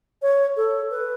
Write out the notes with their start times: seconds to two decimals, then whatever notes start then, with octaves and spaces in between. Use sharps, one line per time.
0.22 C#5
0.57 A4
0.91 B4